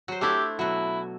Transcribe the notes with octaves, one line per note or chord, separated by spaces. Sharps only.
F#3 C5
A3 D4 E4 G4
B2 F#3 E4